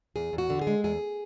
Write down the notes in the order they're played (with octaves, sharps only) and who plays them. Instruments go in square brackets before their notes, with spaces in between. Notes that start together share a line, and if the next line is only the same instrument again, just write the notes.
[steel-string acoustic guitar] E2 G#4
E2
F#4
D3
G#4
G#3
E2 G#4